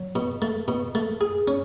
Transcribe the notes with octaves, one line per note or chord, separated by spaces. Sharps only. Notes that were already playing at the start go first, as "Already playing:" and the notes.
Already playing: F#3
B2
A3
B2
A3
G#4
C#4